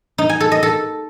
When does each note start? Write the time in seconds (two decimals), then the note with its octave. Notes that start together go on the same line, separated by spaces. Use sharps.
0.18 D#4
0.29 G#5
0.40 A4
0.52 D#5
0.63 A4